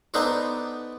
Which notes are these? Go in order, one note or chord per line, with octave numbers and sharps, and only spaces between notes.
B3 D4 D#4 A4 B4 C5